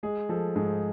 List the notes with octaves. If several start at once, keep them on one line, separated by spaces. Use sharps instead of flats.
G#3 G#4
F3 A4
G#2 G#4